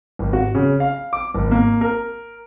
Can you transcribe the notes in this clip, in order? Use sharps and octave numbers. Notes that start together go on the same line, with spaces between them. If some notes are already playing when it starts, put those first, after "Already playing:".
G#1
F#4
C#3
F5
D6
G#1
A#3
A#4